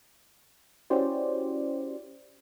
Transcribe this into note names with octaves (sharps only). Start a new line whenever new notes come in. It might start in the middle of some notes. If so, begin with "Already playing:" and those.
C#4 E4 F#4 G4 C5 D5